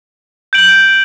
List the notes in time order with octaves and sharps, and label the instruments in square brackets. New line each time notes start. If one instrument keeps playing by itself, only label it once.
[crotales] G6 D7 F#7